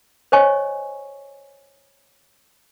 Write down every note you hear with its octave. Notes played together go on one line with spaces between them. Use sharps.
C5 C#5 D#5 G#5 C#6